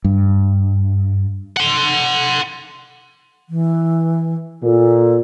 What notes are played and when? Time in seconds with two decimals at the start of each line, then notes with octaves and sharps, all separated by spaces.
0.04 G2
1.57 F#5 C6
3.49 E3
4.63 A#2 A4